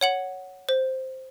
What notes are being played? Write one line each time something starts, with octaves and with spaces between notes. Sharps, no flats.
C#5 F#5 F#7
C5